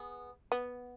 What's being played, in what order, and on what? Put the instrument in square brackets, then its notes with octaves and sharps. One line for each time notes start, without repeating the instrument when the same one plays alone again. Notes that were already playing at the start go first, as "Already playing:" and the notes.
Already playing: [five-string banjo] B3 G#4 B4
[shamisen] B3